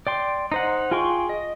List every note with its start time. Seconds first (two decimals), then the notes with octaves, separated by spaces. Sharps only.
0.07 D5 G5 C6
0.52 D#4 C5 F#5
0.91 F4 G#4 G5 C6 C#6
1.29 D#5